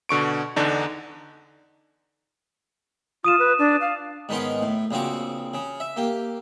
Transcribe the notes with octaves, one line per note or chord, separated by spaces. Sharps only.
B2 D3 C#6 D7
E2 D3 D4 D#4
F4 D#6 D#7 E7
B4
D4
F5
G#2 D#3 B3 C#4 C6 D6
A2
A#1 C#3 C4 F#4 D6
C#3
E5
A#3 G4